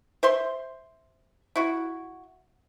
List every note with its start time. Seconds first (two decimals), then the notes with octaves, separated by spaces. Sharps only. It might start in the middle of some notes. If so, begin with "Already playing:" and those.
0.23 C5 E5 C6
1.56 E4 F#4